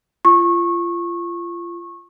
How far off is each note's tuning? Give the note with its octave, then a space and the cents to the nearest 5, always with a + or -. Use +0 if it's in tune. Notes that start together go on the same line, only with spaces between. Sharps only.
F4 -25 C#6 -20